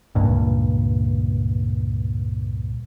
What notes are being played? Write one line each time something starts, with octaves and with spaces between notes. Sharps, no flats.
C#2 G2 A#2